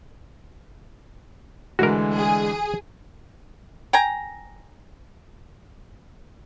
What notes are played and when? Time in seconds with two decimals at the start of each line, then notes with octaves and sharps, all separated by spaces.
1.79 D2 D3 E3 G#3 F#4 A#4
2.17 G#4
3.93 G5 G#5 A#5